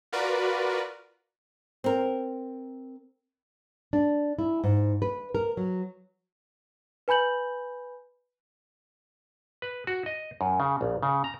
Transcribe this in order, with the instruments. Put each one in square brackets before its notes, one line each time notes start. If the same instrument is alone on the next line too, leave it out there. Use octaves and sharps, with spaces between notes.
[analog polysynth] F4 F#4 A#4 B4 D5
[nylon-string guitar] C4 A#4
D4
E4
G#2
B4
A#4
F#3
[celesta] B4 G#5 B5 G6 F#7
[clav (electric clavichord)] B4
F#4
D#5
F#2
C#3
A#1
C#3
A#5